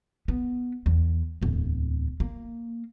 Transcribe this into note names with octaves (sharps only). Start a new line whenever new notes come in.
B3
E2
D1 E2
A#3